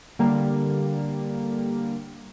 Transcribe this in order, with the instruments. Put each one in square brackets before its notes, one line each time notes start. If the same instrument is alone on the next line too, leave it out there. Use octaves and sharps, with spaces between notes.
[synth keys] D3 G3 A#3